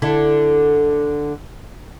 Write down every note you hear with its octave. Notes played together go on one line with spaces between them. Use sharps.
D3 E4 A4